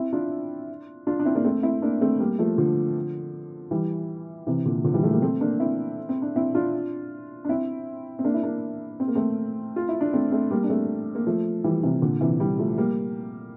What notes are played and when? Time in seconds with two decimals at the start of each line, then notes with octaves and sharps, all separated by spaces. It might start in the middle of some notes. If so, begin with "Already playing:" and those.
Already playing: C4 E4
0.13 D4 F4
1.07 D4 F4
1.19 D4
1.25 C4 E4
1.35 A#3 D4
1.45 A3 C4
1.63 C4 E4
1.82 A#3 D4
2.01 A3 C4
2.20 G3 A#3
2.39 F3 A3
2.58 D3 F3
3.71 E3 G3
4.47 C3 E3
4.65 A#2 D3
4.84 D3 F3
4.94 E3 G3
5.03 F3 A3
5.13 G3 A#3
5.22 A3 C4
5.41 A#3 D4
5.60 C4 E4
6.09 C4
6.22 D4
6.36 C4 E4
6.55 D4 F4
7.45 D4
7.49 C4 E4
8.19 C4
8.24 A#3 D4
8.34 E4
8.43 A#3 D4
9.00 C4
9.08 A#3
9.15 A3 C4
9.76 F4
9.89 E4
10.01 D4
10.13 A3 C4
10.32 A3 C4
10.51 G3 A#3
10.64 D4
10.70 A3 C4
11.15 A#3
11.27 F3 A3
11.64 E3 G3
11.83 C3 E3
12.02 A#2 D3
12.21 C3 E3
12.40 E3 G3
12.59 F3 A3
12.78 G3 A#3